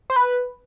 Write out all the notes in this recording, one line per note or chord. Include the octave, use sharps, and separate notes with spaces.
C5
B4